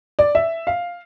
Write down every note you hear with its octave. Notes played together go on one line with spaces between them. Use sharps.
D5
E5
F5